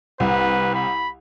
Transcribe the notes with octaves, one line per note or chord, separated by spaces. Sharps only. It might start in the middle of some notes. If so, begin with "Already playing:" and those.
C2 B4
B5